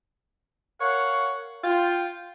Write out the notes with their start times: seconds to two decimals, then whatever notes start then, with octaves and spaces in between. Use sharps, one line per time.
0.79 A#4 C#5 F5 F#5
1.64 F4 G5